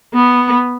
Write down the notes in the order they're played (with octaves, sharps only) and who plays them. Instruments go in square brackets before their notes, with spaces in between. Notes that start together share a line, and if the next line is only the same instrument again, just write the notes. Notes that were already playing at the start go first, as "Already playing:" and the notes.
[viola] B3